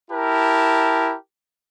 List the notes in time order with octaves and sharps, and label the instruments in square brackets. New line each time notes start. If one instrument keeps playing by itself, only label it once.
[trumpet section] E4 G4 A#4 A5